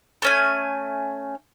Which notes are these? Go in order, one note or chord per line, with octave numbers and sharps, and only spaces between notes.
A3 C#4 G#5